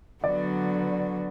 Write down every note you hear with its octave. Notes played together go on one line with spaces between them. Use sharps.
D3 F#3 B3 F#4 D5